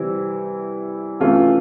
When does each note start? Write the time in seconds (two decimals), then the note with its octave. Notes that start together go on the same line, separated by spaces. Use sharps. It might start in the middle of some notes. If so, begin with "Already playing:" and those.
Already playing: C3 E3 G3 C4 E4
1.20 C3 E3 A3 C#4 F4